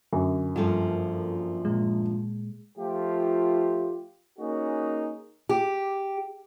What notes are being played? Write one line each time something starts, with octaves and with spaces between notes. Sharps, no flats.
F#2 D3
G2 F3 A#3 F4 A4
A#2 G#3
F3 A3 F4 G4
A#3 C#4 D#4 F#4 G#4
G4